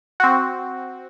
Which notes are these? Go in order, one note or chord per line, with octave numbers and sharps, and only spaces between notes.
C4 F#4